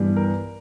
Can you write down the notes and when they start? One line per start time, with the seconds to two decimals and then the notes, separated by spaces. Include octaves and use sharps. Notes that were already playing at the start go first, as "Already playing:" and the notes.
Already playing: G2 E3 G3 B3
0.16 A#4